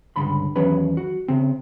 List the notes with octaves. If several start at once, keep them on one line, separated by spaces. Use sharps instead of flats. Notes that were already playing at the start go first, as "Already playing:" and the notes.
C#2 G2 D3 B5 C6
E2 D#3 F#3 C#4 B4 B5
F#4
C#3 C4